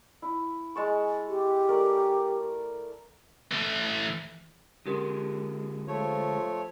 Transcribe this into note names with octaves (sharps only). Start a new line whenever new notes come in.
E4
G#3 A5 C#6
G4
A3 A#4 D5
E3 A3
D3 G#3 C#4 G4 A#4
F3 A3 C#5